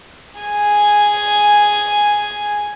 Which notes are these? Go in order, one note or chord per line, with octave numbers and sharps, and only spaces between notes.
G#4 G#5